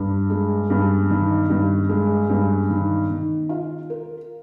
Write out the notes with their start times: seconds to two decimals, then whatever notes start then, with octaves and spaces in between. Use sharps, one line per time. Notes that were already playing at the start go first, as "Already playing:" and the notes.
Already playing: G2
0.30 G#3
0.70 G2
1.10 D#3
1.50 G2
1.89 G#3
2.29 G2
2.70 D#3
3.10 D#3
3.49 F4
3.90 A#4